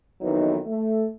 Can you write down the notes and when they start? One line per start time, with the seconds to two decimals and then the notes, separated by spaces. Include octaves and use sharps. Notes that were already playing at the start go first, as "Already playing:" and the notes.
0.21 F2 D#3 E3 F#3 B3 D#4
0.65 A3